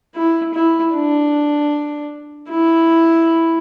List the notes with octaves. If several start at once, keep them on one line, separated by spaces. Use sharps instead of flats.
E4
E4
D4
E4